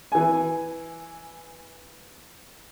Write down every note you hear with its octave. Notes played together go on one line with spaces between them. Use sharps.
E3 G#5